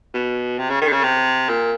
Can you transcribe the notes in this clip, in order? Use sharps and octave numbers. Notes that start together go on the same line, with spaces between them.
B2
C3
C#3
D#3
D3
C#3
C3
A#2